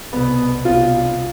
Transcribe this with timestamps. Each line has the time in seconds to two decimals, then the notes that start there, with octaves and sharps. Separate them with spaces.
0.13 C2 B2 B3
0.65 C2 B2 F4